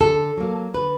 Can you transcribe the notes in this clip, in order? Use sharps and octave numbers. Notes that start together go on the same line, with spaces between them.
D3 A4
F#3 A#3
D3 B4